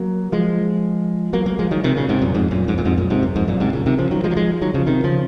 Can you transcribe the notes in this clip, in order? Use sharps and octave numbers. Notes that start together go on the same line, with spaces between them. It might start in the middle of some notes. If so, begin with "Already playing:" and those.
Already playing: F#3 A#3
F3 G#3
F#3 A#3
F#3 A#3
F3 G#3
D#3 F#3
C3 D#3
A#2 C#3
G#2 C3
F#2 A#2
F2 G#2
F#2 A#2
F2 G#2
A#2
F2 G#2
F#2 A#2
G#2 C3
F#2
F2 G#2
F#2 A#2
G#2 C3
A#2 C#3
C3 D#3
C#3 F3
D#3 F#3
F3 G#3
F#3
F3 G#3
D#3 F#3
C#3 F3
C3 D#3
C#3 F3